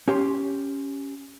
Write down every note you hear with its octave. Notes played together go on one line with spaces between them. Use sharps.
C#4 G4 C6